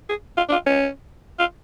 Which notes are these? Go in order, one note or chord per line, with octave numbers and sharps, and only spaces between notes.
G#4
F4
D4
F4
C#4
F4